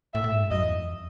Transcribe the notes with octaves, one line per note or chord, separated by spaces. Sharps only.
A2 E5
A2
G#2
G2
F#2 D#5
E2
F2